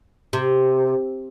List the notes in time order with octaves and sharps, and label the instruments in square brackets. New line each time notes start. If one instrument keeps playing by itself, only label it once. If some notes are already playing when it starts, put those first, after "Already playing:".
[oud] C3